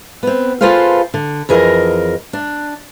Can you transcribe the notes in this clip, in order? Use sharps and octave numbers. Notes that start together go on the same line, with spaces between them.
B3 C4
F4 G#4 A4 B4 C5 F5
D3
F2 E3 G#4 A#4 D#5
D4